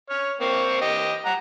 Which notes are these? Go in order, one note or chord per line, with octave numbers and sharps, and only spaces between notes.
C#5 F6
A#3 C4 C#6
G4 D#5 G5
F#5 A#5